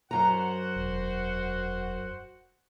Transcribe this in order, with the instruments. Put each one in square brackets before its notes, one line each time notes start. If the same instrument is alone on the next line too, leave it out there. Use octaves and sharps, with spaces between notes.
[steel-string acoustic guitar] F#2 A#5 [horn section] F#4 C5 F#5
[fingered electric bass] E1